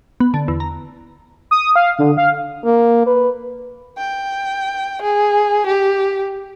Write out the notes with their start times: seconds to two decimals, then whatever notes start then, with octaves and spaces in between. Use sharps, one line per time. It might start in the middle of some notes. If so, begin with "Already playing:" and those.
0.20 B3
0.34 D3
0.48 E2
0.60 A#5
1.51 D#6
1.76 F5
1.99 D3
2.17 F5
2.65 A#3
3.06 B4
3.98 G5
5.02 G#4
5.66 G4